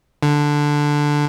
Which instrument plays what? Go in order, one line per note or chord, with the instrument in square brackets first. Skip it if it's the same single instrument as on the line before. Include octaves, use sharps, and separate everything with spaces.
[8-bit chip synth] D3